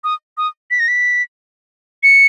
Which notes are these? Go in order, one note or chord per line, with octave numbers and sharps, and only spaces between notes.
D#6
D#6
B6
A#6
B6
C#7